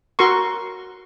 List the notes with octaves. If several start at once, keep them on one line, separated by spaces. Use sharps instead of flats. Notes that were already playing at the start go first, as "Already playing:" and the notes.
F#4 A#4 C6 C#6